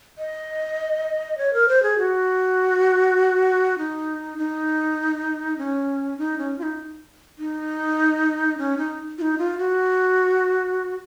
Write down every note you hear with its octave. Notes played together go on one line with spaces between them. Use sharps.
D#5
C#5
A#4
C5
G#4
F#4
D#4
D#4
C#4
D#4
C#4
F4
D#4
D#4
C#4
D#4
F4
D#4
F4
F#4